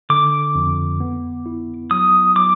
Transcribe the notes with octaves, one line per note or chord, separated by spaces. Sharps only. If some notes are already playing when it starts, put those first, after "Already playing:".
D3 D6
F2
B3
E4
F#3 D#6
F#3 D6